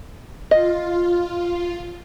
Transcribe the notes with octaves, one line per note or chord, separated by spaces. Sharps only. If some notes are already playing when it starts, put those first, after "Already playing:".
F4 D#5